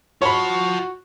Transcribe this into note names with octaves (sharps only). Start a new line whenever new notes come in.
F4 F#4 C#5 A5 B5